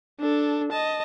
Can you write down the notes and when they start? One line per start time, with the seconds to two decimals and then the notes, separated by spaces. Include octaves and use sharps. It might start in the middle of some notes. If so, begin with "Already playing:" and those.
0.20 D4 A4
0.72 D#5 A5